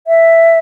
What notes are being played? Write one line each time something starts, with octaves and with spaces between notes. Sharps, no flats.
E5